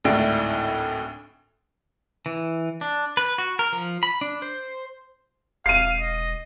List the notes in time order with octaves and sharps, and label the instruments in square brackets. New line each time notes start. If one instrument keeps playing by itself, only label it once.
[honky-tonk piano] G#1 D2 A2 D4 E4 D7
[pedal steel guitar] E3
D4
B4
F#4
A#4
F3
B5
D4
C5
[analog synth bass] E1 [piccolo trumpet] F5 [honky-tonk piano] C7 D#7
[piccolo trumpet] D#5